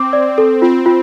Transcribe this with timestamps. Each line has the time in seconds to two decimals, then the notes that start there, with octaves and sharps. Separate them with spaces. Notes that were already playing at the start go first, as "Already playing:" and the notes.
Already playing: C4 D6
0.13 D5
0.38 A4
0.62 C4 F4
0.86 F4